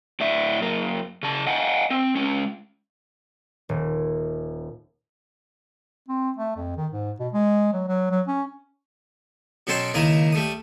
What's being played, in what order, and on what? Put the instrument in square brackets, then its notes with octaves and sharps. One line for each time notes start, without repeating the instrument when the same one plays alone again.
[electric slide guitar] A2 D5 E5
F#2 A#3
C#3 A5
D#5 F5 F#5 G#5
C4
G#3 C#4
[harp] D#1
[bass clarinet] C4
A3
F2
D#3
G#2
B2
G#3
F#3
F#3
F#3
C#4
[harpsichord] B2 F#3 C#4 A4 G5 C6
C#2 D#3 A#3 E4 A#5 D#6
G3 A3 D#6